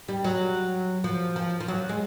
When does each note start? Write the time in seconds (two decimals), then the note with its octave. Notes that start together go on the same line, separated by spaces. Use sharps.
0.08 G3
0.24 F#3
1.04 F3
1.36 F3
1.60 F3
1.68 F#3
1.89 G#3